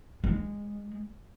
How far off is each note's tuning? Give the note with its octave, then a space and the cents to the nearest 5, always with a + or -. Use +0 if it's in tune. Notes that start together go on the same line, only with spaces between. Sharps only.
G#3 -15